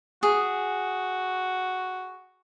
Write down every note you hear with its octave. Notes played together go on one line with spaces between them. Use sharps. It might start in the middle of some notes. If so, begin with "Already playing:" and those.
F#4 G#4